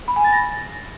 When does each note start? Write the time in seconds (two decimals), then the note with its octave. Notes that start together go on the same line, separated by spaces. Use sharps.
0.08 B5
0.16 G#5
0.24 A6
0.33 A#6